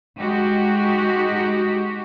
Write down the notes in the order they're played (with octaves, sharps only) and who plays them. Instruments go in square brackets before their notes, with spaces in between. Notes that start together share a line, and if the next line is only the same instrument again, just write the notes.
[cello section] G#3 D#4 F#4 G4